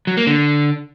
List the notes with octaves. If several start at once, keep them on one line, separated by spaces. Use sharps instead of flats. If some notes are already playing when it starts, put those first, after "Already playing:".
F#3
A#3
D3